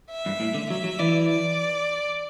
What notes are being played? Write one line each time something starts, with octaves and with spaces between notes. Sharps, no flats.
E5
G2
A2
D3
F#3 E5
F#3
E3 D5
D5